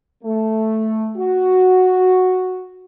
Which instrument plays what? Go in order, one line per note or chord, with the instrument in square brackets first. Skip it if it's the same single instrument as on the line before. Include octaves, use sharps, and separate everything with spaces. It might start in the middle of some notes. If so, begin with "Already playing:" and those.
[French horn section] A3
F#4